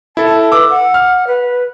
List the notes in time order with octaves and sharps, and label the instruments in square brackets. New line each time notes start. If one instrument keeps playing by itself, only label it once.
[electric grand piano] E4 A4 [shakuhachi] A5
[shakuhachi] B4 [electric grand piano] D6 E6
[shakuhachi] F#5
[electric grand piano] F6
[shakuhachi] B4